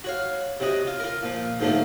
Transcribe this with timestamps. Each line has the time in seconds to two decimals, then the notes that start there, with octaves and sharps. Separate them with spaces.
0.04 F#4 C#5 F5
0.60 C3 F#3 F#4 D#5
0.87 F4
1.00 F4 A#4
1.23 A#2 F3
1.60 G#2 D3 F3 F#3 A3 A#3